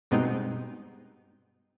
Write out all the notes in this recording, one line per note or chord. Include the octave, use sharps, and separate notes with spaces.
G2 B2 G#3 B3 C4 D#4